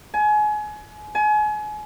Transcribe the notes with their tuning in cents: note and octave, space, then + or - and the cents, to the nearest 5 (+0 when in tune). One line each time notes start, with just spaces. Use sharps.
G#5 +30
G#5 +35